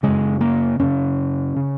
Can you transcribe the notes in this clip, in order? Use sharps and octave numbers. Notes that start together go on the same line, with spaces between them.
F#2 C#3 G#3
A#3
F#2 C#3 C#4
C#3